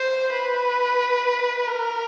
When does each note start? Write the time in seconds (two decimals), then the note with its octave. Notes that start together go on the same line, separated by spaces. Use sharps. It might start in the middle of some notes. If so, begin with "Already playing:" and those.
Already playing: C5
0.32 B4
1.67 A#4